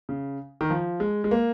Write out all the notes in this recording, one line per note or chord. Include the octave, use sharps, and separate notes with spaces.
C#3
D#3
F3
G#3
G#3
A#3